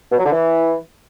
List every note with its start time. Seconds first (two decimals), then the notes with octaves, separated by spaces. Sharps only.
0.12 B2
0.18 F#3
0.25 D3
0.31 E3